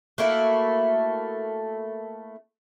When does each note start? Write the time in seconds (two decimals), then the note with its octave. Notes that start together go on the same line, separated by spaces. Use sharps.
0.18 A3 A#3 E4 F#4